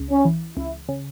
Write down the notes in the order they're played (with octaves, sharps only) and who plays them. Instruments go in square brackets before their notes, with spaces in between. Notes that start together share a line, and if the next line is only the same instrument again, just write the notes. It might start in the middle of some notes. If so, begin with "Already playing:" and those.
Already playing: [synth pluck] C#2
[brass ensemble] C#4
[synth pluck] E3
[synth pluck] C#2 [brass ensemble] E4
[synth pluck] C#3